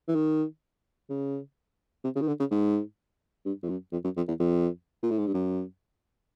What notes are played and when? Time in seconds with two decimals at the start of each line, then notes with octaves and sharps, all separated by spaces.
0.08 E3
0.15 D#3
1.10 C#3
2.04 C3
2.16 C#3
2.21 D#3
2.28 D3
2.40 C#3
2.51 G#2
3.45 G2
3.63 F2
3.69 F#2
3.92 F2
4.04 F#2
4.17 F2
4.28 E2
4.40 F2
5.03 A#2
5.11 A2
5.18 G#2
5.27 G2
5.34 F#2